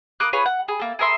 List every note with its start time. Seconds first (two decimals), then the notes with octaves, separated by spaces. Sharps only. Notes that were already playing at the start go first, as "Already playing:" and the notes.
0.20 A#3 D6 D#6 F#6
0.33 F4 G#4 B4 C#5
0.46 F#5
0.68 G#4
0.80 A#3 A4
0.99 G#4 A#4 E5 C6